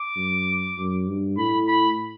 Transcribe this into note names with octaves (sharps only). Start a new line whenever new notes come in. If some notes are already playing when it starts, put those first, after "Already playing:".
Already playing: D6
F#2
F#2
G2
A2 B5
B5